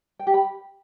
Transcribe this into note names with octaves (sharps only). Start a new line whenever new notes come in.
G5
G4
B5